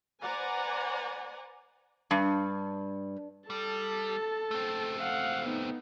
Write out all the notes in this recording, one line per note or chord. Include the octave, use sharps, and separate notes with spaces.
B4 C5 D5 F#5 G#5 A#5
G2
G3 A4 A5
A3 C4
F5 F#5
B3 D#4